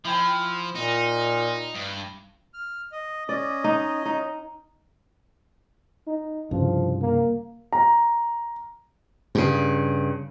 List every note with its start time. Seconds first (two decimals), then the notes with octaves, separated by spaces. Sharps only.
0.05 F3 E4 G5 G#5
0.75 A#2 D#4
1.74 G2
2.54 F6
2.92 D#5
3.29 C#4 D5 D#5
3.64 D#4
4.05 D#4
6.07 D#4
6.51 C2 G2 C#3 F3
7.02 A#3
7.73 A#5
9.35 G2 C#3